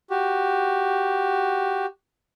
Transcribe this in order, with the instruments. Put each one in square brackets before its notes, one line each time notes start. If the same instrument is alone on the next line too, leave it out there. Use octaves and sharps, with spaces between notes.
[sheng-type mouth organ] F#4 G4